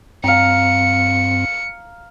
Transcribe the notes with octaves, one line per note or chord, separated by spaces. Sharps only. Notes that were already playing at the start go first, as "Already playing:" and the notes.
G2 C4 F5 A#5 C#7